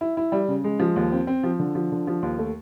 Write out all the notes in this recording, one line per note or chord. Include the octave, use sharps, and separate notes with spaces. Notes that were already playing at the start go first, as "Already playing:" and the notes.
E4
E4
G3
C#3
G#3
F3
D#2
C4
C4
F3
D3
F3
D3
F3
D#2
A3